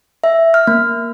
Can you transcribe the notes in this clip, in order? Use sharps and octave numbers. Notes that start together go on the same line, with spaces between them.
E5
F6
A#3